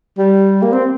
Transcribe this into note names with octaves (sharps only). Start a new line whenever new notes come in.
G3
A#3
C4